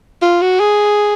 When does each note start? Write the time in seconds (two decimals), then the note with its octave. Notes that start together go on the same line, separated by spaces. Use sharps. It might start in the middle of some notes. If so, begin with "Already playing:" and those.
0.22 F4
0.41 F#4
0.60 G#4